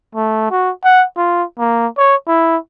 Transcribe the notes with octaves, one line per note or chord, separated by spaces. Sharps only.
A3
F#4
F#5
F4
A#3
C#5
E4